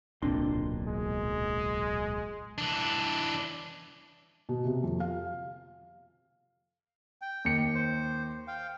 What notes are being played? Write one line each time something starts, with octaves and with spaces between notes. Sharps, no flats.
D1 B1 A#2 C4 D4 C6
G#3
E3 D4
B2
C3
F2
F5
G5
D#2 C#7
C5
F5 G5